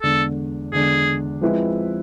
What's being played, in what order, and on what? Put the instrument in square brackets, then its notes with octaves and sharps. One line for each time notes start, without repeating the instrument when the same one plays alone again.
[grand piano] E2 D3 G#3 D4 [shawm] A4
[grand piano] E2 D3 G#3 D4 [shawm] G#4
[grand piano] F3 G#3 C4 E4 B4